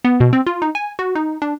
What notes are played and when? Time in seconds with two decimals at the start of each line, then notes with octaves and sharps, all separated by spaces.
0.05 B3
0.20 B2
0.33 C4
0.47 F4
0.62 D#4
0.75 G#5
0.99 F#4
1.15 D#4
1.42 D4